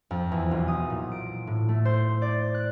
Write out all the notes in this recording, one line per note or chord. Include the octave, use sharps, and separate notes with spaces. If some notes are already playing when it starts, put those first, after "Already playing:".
F2
E2
B1
D#6
A#2
D7
A2
A3
C5
D5
F#6